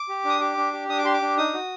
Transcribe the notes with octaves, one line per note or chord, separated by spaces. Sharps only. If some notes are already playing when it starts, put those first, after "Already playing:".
Already playing: D6
G4
D4 D#6
G4 D6
D4
G4
D4 D#6
D6
G4 C6
D6
D4
D#4 D#6
F#4